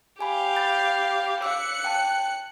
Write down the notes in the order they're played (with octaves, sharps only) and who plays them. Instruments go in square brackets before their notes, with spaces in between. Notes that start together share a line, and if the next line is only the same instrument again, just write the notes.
[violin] G4 F5 [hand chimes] G#5 B5
[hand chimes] B5 G6 A6
[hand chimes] F5 D6 E6 [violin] F#6 C#7
[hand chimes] G5 A5